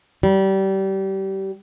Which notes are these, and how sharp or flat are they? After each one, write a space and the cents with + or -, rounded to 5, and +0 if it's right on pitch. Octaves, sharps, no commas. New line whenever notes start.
G3 -25